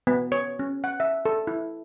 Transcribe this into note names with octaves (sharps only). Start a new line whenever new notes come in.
B3
C#5
C#4
F#5
E5
A4
E4